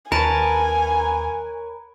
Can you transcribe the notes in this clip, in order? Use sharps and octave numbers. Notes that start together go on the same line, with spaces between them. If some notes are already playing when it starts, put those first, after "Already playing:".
D#2 A#4 B4 C#5 G#5 A5